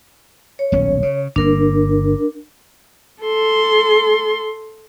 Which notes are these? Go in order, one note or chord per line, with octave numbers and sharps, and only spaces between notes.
C#5
D#1 B1 C#4
C#3
G1 A#3 D4 A#4
A4 C6